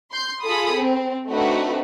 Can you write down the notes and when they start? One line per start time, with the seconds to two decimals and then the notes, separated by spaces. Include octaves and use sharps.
0.11 C6 G6
0.42 F4 G#4 A4 B5 D#6
0.74 C4
1.29 A3 C4 D4 D#4 F#4 B4